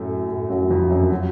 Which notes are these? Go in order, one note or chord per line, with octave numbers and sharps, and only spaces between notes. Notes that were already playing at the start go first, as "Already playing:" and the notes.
Already playing: F#2 A2 F#3 A3
A2 A3
F#2 F#3
F2 F3
F#2 F#3
F#3